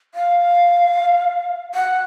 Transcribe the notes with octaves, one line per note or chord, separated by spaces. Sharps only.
F5
F#5